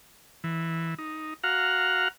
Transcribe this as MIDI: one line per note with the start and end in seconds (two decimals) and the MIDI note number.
0.44 0.94 52
0.99 1.34 63
1.43 2.08 66
1.43 2.08 77
1.43 2.08 78
1.43 2.08 82
1.43 2.08 89